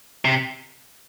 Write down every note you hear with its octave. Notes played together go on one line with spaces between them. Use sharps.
C3